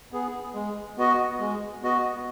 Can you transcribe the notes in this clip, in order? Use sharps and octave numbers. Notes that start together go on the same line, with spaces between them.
B3 G#4
G#3
B3 F#4 D#5
G#3
B3 F#4 D#5